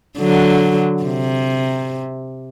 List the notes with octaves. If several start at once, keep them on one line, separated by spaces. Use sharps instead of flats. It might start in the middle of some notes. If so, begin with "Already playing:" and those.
D3 F#3
C3